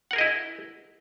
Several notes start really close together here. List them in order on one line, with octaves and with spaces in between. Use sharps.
F#5 A#4 G#4 D#5 E4